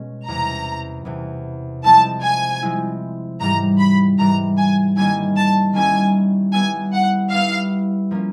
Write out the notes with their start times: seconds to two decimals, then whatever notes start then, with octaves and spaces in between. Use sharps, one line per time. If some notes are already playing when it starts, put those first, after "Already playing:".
Already playing: B2 G#3 C#4
0.27 E2 C3 E3 A#5
1.05 E2 C3 E3
1.84 F3 G#3 C4 E4 A5
2.23 G#5
2.62 F3 G#3 C4 E4
3.40 G#2 E3 G3 A#5
3.79 B5
4.18 G#2 E3 G3 A#5
4.58 G#5
4.97 D#3 G3 A#3 C#4 E4 G#5
5.36 A5
5.73 D#3 G3 A#3 C#4 E4 G#5
6.53 G3 B3 E4 G#5
6.93 F#5
7.31 G3 B3 E4 F5
8.11 F3 A#3 C#4